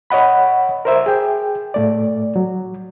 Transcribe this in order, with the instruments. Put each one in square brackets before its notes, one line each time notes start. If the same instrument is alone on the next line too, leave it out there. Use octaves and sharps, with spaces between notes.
[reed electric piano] C#5 D#5 F#5 B5
A#4 C5 E5
G#4 G5
A2 A3 D5
F#3